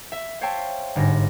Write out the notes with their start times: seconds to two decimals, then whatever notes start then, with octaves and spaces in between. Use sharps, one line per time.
0.12 E5
0.41 C5 C#5 E5 F5 G5 A5
0.96 G1 G#2 A#6